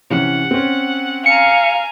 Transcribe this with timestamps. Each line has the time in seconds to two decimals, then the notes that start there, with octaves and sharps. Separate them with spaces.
0.10 C3 E3 C#4 F#5
0.51 C4 C#4
1.26 F5 G#5 A#5 C#7